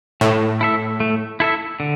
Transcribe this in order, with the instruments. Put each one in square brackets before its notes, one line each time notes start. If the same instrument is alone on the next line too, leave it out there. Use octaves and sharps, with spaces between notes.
[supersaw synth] A2 [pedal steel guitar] A3
[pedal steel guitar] E4 A4 E5
A3
E4 A4 E5
D3